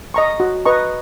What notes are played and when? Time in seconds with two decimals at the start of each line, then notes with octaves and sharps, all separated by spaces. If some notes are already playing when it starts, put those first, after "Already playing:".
0.14 D#5 A#5 C#6
0.40 F#4
0.66 B4 D#5 A#5 C#6